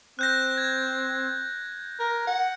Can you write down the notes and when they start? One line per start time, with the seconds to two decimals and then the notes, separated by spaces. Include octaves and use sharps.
0.19 C4 F#6 G6 A#6
0.58 G#6
1.99 A#4
2.27 F#5